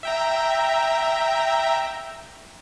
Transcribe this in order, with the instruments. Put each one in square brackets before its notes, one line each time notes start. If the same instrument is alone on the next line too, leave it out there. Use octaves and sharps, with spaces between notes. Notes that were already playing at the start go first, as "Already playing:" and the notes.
[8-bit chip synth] E5 G5 A#5